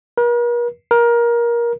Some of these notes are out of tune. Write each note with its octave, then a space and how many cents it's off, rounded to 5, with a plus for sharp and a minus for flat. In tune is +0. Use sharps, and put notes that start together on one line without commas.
A#4 +45
A#4 +20